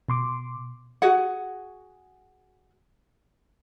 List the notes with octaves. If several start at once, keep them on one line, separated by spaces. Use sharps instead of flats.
B2 C6 D6
F#4 G#4 F#5